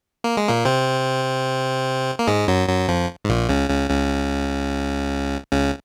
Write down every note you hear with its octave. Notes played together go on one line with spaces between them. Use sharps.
A#3
G#3
A#2 A#3
C3 C4
A#3
G#2 G#3
F#2 F#3
F#2 F#3
F2 F3
G#2
A#1 A#2
C#2 C#3
C#2 C#3
C#2 C#3
C#2 C#3